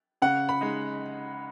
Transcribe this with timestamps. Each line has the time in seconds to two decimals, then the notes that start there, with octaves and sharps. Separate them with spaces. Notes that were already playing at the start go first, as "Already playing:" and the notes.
0.22 C#3 F#5
0.49 B5
0.61 G#3 D#4